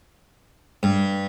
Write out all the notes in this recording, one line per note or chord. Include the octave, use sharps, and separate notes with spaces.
G2